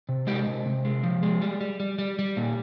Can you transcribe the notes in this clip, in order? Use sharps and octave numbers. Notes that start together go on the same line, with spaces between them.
C3
G#3 G4
C3
C3
G#3
F3
G#3
G3
G3
G3
G3
G3
A#2